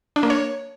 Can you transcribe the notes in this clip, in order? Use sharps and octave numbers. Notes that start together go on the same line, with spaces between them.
D4
A#3
C#5